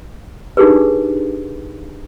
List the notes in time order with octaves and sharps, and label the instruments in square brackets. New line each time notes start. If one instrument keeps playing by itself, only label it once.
[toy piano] D4 D#4 G4 G#4 A#4 B4